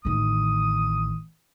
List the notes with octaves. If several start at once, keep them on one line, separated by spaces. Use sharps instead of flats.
A1 D#3 D#6